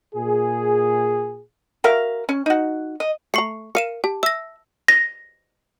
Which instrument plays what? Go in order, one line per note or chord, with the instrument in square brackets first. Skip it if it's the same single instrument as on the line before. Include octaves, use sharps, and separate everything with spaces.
[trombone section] A#2 G#4
[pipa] F#4 A#4 E5 F5
C#4
D#4 F#4
D#5
[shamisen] A3 A#5 [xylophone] C#6 C7 C#7
[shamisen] A#4 F5 [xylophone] C#7 D#7 E7
[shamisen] G4 [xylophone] A5
[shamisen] E5 [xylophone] E6 A#6
[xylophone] A#6